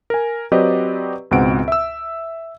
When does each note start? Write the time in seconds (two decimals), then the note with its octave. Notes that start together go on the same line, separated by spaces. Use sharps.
0.10 A#4 G#5
0.52 F#3 C4 G4 B4 D5 D#5
1.31 C#2 G#2 B2 C4 F#5 D7
1.68 E5 E6